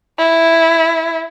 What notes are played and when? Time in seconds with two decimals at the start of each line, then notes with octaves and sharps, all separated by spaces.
0.18 E4